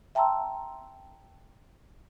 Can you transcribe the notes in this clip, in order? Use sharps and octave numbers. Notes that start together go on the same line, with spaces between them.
E5 G5 A5 A#5 C6 E6